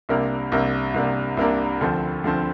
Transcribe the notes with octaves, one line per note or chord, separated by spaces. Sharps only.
C2 C3 A#3 D4 A#4
C2 C3 A#3 D4 A#4
C2 C3 A#3 D4 A#4
C2 C3 A#3 D4 A#4
D2 D3 F3 C4
D2 D3 F3 C4